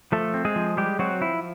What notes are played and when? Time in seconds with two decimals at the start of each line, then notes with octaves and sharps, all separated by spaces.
0.12 F3 A3 A4
0.34 C4
0.45 G#3 G#4
0.56 F3
0.77 G3 G#3 G4
0.99 F#3 C4 F#4
1.21 F3 E4